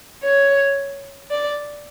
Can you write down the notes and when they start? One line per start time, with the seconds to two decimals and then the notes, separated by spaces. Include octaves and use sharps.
0.23 C#5
1.30 D5